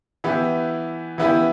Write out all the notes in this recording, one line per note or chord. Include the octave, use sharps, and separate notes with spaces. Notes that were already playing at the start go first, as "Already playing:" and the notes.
E3 B3 E4 G4 B4
E3 B3 E4 G4 B4